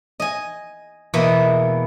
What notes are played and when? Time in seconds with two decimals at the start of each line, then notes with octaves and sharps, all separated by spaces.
0.20 D#5 G#5
1.14 E2 B2 A#3 B3 D#5 E5